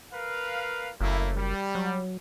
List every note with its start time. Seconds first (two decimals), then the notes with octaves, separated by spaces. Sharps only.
0.12 A#4 B4 F5
1.01 F#1 A3 A#3 E4
1.36 G3
1.75 F#3